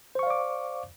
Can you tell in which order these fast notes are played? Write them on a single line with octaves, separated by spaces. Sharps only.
C5 C#6 F5 D5 D6